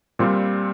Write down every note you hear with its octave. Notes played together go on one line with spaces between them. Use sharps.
A#2 G3 C4 F4